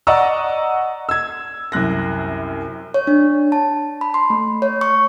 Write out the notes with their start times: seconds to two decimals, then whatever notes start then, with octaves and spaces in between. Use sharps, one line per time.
0.07 D5 D#5 F#5 A#5 C#6 E6
1.09 E6 G#6
1.72 C2 F#2 F#6 A#6
2.94 C#5
3.07 D4
3.52 A5
4.01 B5
4.14 C6
4.30 A3
4.62 C#5
4.81 C#6